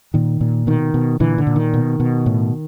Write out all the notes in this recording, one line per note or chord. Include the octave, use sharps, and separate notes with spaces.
A#2 D#3
A#2
B2 D#3
B2
A#2 D3 E3
D3
A#2
D#3
B2
B2
A2